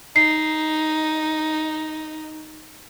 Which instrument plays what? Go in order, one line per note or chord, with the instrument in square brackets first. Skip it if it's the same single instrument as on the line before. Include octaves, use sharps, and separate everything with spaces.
[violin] D#4 [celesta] C7